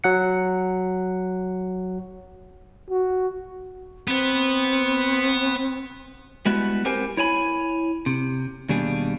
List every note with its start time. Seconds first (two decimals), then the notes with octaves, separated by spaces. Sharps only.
0.04 F#3 F#5 C#7
2.90 F#4
4.08 B3 C4 B4
6.46 G3 G#3 B3 E4 F#4
6.85 B3 C4 G4 A#4 C5 G#5
7.17 E4 C#5 G#5 B5
8.06 C3
8.69 D#2 B2 G3 D4 G#4